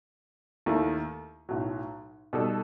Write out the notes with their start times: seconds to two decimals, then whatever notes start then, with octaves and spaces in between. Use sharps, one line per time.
0.66 D#2 D#3 A3 E4
1.49 B1 A2 F#3
2.33 B2 G3 D#4 A4